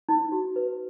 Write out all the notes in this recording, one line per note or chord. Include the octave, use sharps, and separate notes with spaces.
D#4
F#4
B4